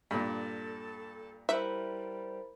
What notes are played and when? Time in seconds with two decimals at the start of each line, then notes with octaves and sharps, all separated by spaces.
0.11 G2 A#2 A4
1.49 G3 E4 A#4 C5 E5